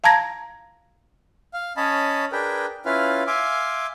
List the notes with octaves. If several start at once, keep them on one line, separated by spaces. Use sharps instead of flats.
F5 A5 A#5 G#6 A#6
F5
C#4 C#5 D#5 A5 B5
D4 G#4 A#4 B4 G5
C#4 E4 F4 B4 F5
E5 F5 G#5 C6 D6